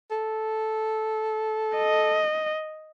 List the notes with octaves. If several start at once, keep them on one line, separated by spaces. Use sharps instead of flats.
A4
D#5